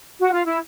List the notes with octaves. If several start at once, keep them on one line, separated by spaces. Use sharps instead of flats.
F#4
F4
E4